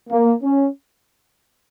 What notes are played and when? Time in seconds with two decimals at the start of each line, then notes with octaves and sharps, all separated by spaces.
0.10 A#3
0.43 C#4